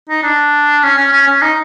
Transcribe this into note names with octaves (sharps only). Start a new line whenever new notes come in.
D#4
D4
C#4
C#4
C#4
C#4
D#4